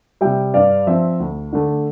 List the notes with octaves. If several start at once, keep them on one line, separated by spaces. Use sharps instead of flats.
C3 G3 E5 G5
G2 D5 F5
F3 C4 E5
D2
D3 A3